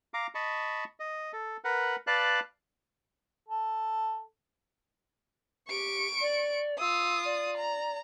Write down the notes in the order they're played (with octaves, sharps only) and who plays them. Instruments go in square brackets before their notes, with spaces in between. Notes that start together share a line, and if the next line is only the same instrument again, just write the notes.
[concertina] F5 A#5 D6
D#5 A5 B5 C#6
D#5
A4
A#4 B4 F#5
B4 D5 F5 A5 F#6
[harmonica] A4
[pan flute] G4 [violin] C#6 D7
[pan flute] D5
[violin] F4 D#6 [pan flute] E6
[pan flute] D5
[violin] A#5